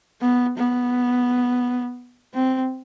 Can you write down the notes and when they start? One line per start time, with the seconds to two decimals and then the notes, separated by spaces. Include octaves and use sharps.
0.21 B3
0.57 B3
2.34 C4